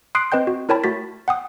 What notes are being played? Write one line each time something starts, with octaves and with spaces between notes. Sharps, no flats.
C6 D#6 F#6 C7 D7
C4 B4 D#5 G5 G6
F#4
E4 A#4 C#5 G5 A5 B5
A3 F#4 A6 B6
F#5 G5 D#6